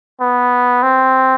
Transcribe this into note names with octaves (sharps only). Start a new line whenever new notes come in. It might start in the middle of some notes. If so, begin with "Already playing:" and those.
B3
C4